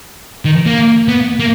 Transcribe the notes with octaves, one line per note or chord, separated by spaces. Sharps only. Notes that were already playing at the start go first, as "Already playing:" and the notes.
D#3
A#3
B3
A#3